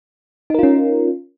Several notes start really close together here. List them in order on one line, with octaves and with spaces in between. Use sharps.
D#4 A#4 F4 C#4